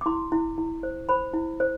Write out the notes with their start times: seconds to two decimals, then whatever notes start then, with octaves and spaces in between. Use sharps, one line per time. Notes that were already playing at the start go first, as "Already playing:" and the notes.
0.01 D6
0.06 E4 C6
0.32 E4
0.58 E4
0.83 C5
1.09 C5 B5
1.34 E4
1.60 C5